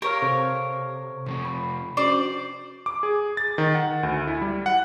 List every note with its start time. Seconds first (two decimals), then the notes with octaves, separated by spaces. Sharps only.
0.02 G4 A#4 C#5 F5
0.22 C3 C4 A4 C5
1.26 C3 F3 C4 C#6
1.45 B5
1.97 C#4 D4 F#4 C5 D5
2.86 D6
3.03 G#4
3.37 A6
3.58 D#3
3.75 F#5
4.03 D2
4.28 E4
4.42 G3
4.66 F#5